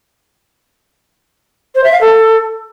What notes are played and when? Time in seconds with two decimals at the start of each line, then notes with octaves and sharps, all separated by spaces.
1.75 C5
1.84 E5
1.92 F5
2.01 A4